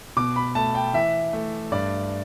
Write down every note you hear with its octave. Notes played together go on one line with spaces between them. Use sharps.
B2 D6
B5
A3 A5
G5
E3 E5
A3
G2 D5